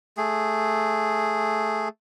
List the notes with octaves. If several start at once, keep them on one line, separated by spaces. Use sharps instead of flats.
A3 G#4